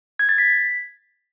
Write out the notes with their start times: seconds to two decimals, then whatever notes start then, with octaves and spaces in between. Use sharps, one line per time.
0.19 G#6
0.29 A6
0.38 B6